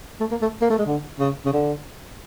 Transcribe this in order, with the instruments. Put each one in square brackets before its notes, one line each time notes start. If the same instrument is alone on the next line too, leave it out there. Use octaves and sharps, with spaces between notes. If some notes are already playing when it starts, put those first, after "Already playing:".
[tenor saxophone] A3
A#3
A3
A#3
A3
G#3
D3
C#3
C#3
D3